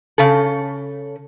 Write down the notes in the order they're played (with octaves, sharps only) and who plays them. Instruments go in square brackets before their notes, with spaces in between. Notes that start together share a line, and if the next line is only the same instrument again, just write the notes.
[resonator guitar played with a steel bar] C#3 A4